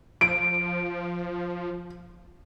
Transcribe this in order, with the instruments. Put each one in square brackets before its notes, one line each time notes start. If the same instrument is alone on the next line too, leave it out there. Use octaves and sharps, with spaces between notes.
[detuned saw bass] F3 [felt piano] D7